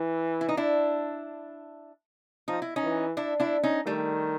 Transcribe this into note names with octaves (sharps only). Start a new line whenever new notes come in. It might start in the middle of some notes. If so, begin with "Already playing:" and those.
Already playing: E3
E4
D#4
D4 E4
F3 D#4
E4
C#4 D#4
E3
D4 E4
D4 E4
C#4 D#4
D#3 G3 A3